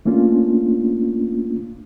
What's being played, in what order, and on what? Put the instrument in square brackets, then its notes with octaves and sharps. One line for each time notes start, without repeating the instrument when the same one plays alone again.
[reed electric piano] A3 A#3 C#4 D4 F4